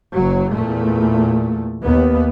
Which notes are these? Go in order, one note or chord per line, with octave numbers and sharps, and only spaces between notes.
F#1 F#3
E2 A#2 A3
D#2 B3